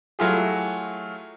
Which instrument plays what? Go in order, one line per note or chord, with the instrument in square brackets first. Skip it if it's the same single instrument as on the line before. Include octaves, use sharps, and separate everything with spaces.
[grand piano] F#3 A3 E4 F4 G4 G#4